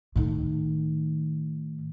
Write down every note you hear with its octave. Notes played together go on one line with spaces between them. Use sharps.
A2 D#3